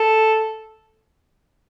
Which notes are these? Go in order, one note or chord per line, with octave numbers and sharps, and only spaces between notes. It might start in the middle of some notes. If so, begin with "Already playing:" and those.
Already playing: A4